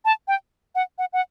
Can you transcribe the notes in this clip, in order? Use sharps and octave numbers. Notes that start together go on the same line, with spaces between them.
A5
G5
F#5
F#5
F#5